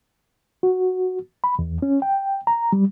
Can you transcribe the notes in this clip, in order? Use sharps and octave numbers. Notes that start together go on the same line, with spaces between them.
F#4
B5
E2
C#4
G5
A#5
G3